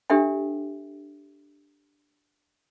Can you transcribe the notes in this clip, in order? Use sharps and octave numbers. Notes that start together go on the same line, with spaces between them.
D4 G4 A4 E5 G5